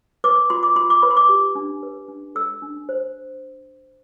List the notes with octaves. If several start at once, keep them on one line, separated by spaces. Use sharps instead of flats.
B4 D6
F4 C6
D6
F4 C6
D6
B4 B5
C6
D6
G4
D4
B4
D4
A4 E6
D4
C5